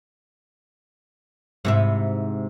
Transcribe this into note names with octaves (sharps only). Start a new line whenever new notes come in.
G#2 C3 E4